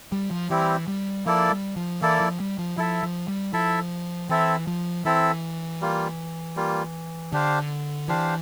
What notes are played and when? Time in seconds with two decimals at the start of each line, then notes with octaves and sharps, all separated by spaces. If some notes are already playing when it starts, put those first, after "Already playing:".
0.12 G3
0.31 F3
0.50 E3 G3 C4 E4 G4
0.88 G3
1.26 F3 A#3 E4 A4 D5
1.51 G3
1.76 F3
2.01 E3 A#3 E4 A4 D5
2.20 F3
2.40 G3
2.58 F3
2.77 F3 E4 A4 E5
3.03 F3
3.28 G3
3.53 F3 E4 A4 E5
4.29 E3 C4 E4 A4 E5
4.67 F3
5.05 E3 C4 E4 A4 E5
5.81 G3 A#3 F4
6.56 G3 A#3 F4
7.33 D3 D4 G4 C5 F5
8.08 E3 D4 G4 C5 F5